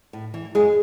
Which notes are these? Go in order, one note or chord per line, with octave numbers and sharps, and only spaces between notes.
A2
E3
F#2 G#3 G#4